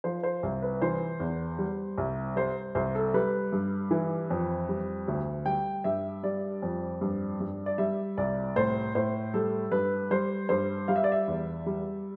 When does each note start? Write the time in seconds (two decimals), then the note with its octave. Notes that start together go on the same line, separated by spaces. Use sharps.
0.04 F3 C5
0.23 C5
0.43 C2
0.62 B4
0.82 E3 C5
1.20 E2
1.59 G3
1.98 C2
2.36 G3 C5
2.75 C2 C5
2.95 A4
3.14 G3 B4
3.52 G2
3.91 E3
4.30 F2
4.69 G3
5.08 D2
5.46 G3 G5
5.84 G2 E5
6.23 G3 D5
6.62 F2
7.01 G2
7.40 G2
7.66 D5
7.78 G3 E5
8.18 C2 D5
8.56 A2 C5
8.95 A2 C5
9.34 G3 A4
9.72 G2 B4
10.11 G3 C5
10.49 G2 C5
10.88 G3 F5
10.96 E5
11.04 D5
11.12 E5
11.28 E2
11.66 G3